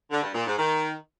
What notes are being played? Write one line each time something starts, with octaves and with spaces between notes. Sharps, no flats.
D3
G2
A#2
G#2
D#3